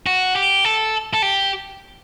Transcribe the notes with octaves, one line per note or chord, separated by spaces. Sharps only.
F#4
G4
A4
A4
G4